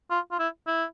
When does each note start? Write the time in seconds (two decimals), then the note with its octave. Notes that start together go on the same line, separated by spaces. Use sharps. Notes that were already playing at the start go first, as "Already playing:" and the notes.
0.11 F4
0.32 F4
0.39 E4
0.67 E4